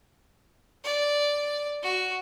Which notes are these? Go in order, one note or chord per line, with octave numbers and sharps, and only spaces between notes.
D5
F#4